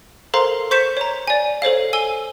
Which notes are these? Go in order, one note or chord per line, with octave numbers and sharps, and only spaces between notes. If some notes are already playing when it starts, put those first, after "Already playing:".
A4 A#4 C5 F5 A#5 C6
C5 C#6 G6 B6 C#7 E7
C#5 A#5
D5 G#5
A4 C5 C#5 F5
G#5 E6 D#7 G7